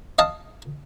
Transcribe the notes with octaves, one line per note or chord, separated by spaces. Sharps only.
D#5 F5 A5